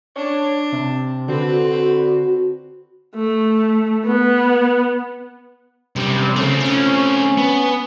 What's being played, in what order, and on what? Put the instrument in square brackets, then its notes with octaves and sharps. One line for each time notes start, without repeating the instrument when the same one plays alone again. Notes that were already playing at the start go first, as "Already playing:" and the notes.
[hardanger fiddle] D4 [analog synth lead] C#5
[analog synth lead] C3
[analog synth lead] D3 [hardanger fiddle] C4 B4 [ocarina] F#4
[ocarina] F#4
[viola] A3
B3
[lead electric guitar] F#2 G3 [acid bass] C3
[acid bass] C#3 [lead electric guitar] A3 C4
[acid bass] C#4
[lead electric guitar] B3